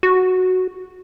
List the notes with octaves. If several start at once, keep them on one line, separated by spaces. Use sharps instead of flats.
F#4